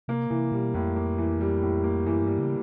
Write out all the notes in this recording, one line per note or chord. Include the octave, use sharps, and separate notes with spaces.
C3 A#3
C3 E3
B2 G3
F2 A2
A#3
E3
G3
A2
A#3
F#2 E3
G2 G3
C#3